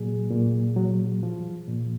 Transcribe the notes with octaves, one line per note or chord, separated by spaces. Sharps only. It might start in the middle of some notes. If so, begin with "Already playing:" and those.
Already playing: A#2 F#3 G#4
A#2
F#3
F3
A#2